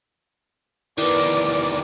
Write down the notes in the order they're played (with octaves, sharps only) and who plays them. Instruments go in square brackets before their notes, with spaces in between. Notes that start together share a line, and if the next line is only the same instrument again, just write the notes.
[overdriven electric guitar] E2 D#3 [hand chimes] E4 B4 [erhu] D5